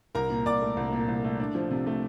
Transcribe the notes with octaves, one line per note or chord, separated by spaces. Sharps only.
C2 A#4 A#5
A#2
C2 D5 D6
A3
C2
A#2
C2
A3
D4
F3
C3
A3